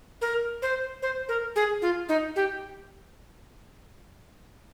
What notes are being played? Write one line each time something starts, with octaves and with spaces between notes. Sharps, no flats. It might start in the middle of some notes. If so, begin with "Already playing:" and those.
A#4
C5
C5
A#4
G#4
F4
D#4
G4